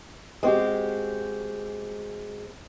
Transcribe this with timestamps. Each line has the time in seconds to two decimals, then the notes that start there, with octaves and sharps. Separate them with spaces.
0.43 G#3 C4 F#4 G4